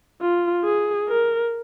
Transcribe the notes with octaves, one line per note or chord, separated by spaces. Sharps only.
F4
G#4
A#4